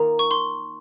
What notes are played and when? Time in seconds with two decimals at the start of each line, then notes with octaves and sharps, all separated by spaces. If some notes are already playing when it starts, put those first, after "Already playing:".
Already playing: D#3 A#3 F4 A#5
0.19 C#6
0.31 C6